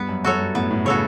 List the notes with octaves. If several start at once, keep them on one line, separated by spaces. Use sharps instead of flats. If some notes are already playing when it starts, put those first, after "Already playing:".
Already playing: G2 B3
F#2
F#2 F#4 A4 C#5
G2
A2 B3
A2
C#3 F#4 A4 C#5